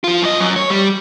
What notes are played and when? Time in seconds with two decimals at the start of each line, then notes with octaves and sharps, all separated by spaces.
0.04 F3 F4
0.22 F#2 D#5
0.40 F#2
0.56 C#5
0.70 G3